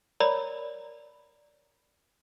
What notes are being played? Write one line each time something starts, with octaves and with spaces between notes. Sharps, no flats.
A#4 C#5 D5 A#5 B5